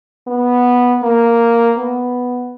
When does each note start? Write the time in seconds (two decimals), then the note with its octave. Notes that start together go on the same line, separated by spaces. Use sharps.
0.27 B3
1.03 A#3
1.77 B3